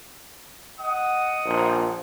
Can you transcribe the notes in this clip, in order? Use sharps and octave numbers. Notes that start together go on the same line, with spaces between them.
D#5 F#5 D#6
A#1